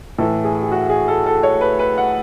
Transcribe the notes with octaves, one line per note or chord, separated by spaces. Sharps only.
A2 E3 A4
G#4
G#4
F#4
G#4
A4
A4
C#5
B4
B4
F#5